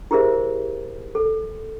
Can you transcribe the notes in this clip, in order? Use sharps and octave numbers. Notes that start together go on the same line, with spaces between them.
E4 G4 G#4 A#4 C5 E5
A4